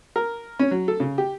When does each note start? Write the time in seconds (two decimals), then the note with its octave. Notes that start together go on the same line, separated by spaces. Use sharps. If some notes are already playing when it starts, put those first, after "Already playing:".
0.16 A#4
0.59 C#4
0.71 F#3
0.88 A4
1.00 C#3
1.18 G4